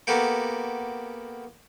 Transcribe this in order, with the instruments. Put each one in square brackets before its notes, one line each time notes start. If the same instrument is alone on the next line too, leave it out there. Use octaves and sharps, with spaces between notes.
[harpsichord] A#3 B3 F#4 G4 A4